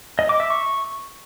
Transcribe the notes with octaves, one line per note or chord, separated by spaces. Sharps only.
D#5
D6
E5
C#6